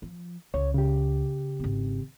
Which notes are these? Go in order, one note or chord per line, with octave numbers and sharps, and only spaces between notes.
F3
C#2 C#5
C#3 G4
G#1 C4